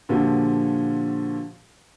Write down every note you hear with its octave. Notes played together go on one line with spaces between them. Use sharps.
A#2 D3 F3 F#4 G4